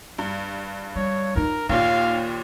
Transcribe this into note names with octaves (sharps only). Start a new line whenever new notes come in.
G2
G3 C#5
D#4 F4 A#4
D#2 A#2 D#4 F5